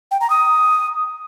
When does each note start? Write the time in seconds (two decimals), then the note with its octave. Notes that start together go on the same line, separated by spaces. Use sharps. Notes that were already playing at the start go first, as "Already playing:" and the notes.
0.11 G5
0.21 A#5
0.30 D#6